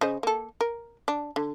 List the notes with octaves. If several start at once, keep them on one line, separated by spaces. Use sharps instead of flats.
C#3 C5 D#5
A#3 A4
A#4
D4
D3